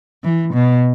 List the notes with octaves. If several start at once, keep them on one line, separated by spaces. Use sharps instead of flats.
E3
B2